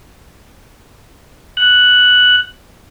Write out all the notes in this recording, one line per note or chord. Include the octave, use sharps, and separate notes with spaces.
F#6